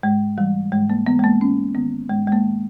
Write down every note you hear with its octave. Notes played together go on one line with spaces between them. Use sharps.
G#2 G#3
E3 G3
G#2 G#3
A#3
E3 B3
G#3
A#3
G#2 C#4
D#3 B3
G#2 G#3
G#3
A#3
D#3